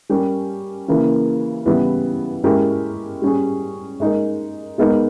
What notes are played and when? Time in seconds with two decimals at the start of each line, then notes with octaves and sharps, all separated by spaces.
0.09 G3 C#4 G4 A#4
0.88 C#3 E3 A#3 E4
1.66 C#3 E3 G3 B3 E4
2.44 G#3 C#4 E4 G4 A#4
3.22 G3 C#4 G#4
4.00 G#3 D#4 A#4
4.78 G#3 B3 D#4 A#4